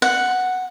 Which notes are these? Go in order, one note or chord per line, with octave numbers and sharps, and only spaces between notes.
F#5